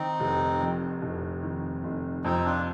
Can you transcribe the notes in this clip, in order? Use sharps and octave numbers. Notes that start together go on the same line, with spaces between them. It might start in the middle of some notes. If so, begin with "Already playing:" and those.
Already playing: D#3 C4 D#4
F1
F2
F1
D#3
F1
F2 C4 D#4
D4 F4